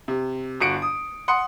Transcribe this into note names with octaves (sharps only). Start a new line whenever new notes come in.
C3
G1 F#4 C#7 D7
D#6
F#5 C6 D#6 C#7